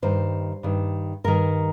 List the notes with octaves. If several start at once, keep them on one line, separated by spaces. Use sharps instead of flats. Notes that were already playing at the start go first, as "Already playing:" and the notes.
G2 D#3 C5
G2 D#3
G2 D#3 A#4